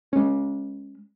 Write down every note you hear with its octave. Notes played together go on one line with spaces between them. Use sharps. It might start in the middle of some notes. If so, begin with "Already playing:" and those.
G#3 C#4